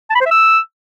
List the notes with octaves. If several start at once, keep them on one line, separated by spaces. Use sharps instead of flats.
A5
B5
C5
E5
E6